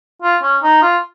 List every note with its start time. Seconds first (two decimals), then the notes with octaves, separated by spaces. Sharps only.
0.22 F4
0.43 C#4
0.63 D#4
0.82 F4